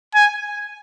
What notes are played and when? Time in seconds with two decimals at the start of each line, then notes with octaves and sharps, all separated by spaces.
0.15 G#5